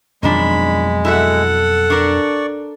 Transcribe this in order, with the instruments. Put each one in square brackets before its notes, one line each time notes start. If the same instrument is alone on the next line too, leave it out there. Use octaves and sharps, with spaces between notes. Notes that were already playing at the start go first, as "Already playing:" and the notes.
[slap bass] F2 B2 F#3 [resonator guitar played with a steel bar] D#3 F3 D4 [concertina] G#3 [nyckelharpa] B5
[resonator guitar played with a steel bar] E4 F#4 E5 [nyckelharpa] A4 F#5
[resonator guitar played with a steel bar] D4 A#4 [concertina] D5 C#6